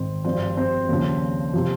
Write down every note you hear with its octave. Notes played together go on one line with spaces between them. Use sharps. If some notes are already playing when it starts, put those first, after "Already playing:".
Already playing: G#1 G#2 D#3 C4
G#1 G2 F3 C4
C4
D#2 C#3 F3
C3 F3